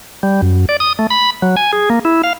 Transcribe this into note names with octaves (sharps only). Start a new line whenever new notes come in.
G3
F#2
D5
D#6
A3
B5
F#3
G#5
G#4
A#3
E4
F5